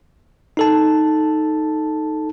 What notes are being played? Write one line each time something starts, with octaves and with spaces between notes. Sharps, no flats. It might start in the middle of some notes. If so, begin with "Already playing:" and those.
D#4 A4 A5